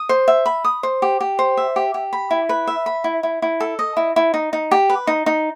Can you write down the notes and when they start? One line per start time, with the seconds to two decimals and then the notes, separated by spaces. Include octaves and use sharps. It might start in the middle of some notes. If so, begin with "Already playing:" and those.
Already playing: D#6
0.09 C5
0.28 E5
0.46 B5
0.64 D#6
0.83 C5
1.02 G4
1.21 G4
1.39 C5
1.57 E5
1.76 G4
1.94 G4
2.13 B5
2.31 E4
2.49 B4
2.67 E5
2.86 B5
3.04 E4
3.23 E4
3.42 E4
3.60 A4
3.79 D#5
3.97 E4
4.16 E4
4.34 D#4
4.53 D#4
4.71 G4
4.90 B4
5.07 D#4
5.26 D#4